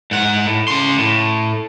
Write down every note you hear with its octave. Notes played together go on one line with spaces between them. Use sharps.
G#2 F#5
A2
C#3 C6
A2